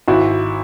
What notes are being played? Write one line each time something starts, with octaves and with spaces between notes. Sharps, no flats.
G#1 E4 F#4